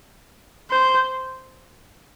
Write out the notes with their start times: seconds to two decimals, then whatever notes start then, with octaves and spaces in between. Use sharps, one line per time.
0.71 C5